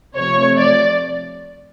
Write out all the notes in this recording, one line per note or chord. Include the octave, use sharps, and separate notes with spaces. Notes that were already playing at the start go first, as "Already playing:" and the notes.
C3 F3 A3 C#5
D5